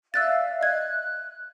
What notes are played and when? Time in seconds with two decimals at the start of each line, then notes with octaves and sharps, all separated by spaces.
0.14 D5 E5 F5 E6 F#6 A6
0.61 D#5 F#6 G#6